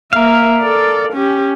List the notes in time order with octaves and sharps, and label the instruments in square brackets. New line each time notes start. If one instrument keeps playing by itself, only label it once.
[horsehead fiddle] A#3 E5 [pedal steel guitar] A#4 F5
[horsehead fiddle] A4 D5
C#4 G4